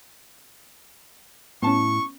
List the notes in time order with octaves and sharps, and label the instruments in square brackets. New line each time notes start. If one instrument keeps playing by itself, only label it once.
[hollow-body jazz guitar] A2 A5 [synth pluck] B3 C#4 [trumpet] C#6